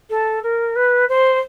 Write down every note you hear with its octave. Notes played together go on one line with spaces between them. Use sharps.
A4
A#4
B4
C5